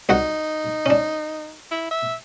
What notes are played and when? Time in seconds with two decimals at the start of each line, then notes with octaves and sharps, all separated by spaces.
0.09 C2 D#4 F#4 F#5
0.86 C#4 D4
1.71 E4
1.91 E5